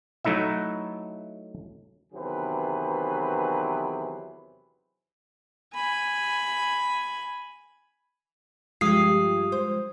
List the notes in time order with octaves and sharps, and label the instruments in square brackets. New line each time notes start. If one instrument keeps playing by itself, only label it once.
[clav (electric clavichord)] F#3 A3 D#4 E4 E5
[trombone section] E2 C3 D#3 F#3 G#4 B4
[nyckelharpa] G#5 B5
[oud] G2 G4 [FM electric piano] F3 G#3 F4 [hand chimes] D#6 C7
[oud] C5